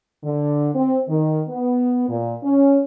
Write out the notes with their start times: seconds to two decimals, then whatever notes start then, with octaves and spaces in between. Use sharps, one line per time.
0.24 D3
0.74 C4
1.08 D#3
1.49 B3
2.09 A#2
2.43 C#4